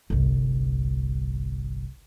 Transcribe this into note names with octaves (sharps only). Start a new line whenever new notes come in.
G1 C2